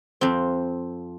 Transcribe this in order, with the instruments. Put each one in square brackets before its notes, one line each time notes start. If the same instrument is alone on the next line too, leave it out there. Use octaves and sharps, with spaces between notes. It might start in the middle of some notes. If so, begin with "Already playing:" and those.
[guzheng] F2 C4